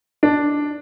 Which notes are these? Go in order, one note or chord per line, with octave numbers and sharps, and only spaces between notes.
D4